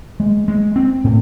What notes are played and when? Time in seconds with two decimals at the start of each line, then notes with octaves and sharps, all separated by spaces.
0.20 G#3
0.48 G#3
0.76 C4
1.04 A2